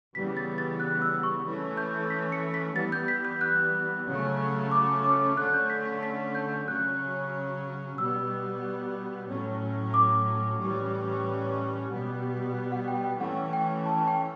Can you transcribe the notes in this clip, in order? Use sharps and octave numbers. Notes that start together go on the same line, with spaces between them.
C#3 E3 G3 B3 B6
A6
A6
F#6
E6
C#6
E3 A3 C#4
G6
B6
C#7
B6
E3 G3 B3 A6
G6
B6
G6
F#6
C#3 F#3 A3 C#4
D6
D6
D3 A3 C#4 F#6
G6
B6
B6
B6
G6
C#3 F#3 C#4 F#6
B2 G3 B3 E6
A2 F#3 C#4
D6
A2 E3 G3 C#4
B2 G3 B3
F#5
G5
G5
E3 A3 C#4 F#5
G5
A5
G5